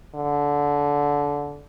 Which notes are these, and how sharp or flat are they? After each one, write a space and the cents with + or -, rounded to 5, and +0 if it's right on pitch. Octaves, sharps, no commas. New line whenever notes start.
D3 -20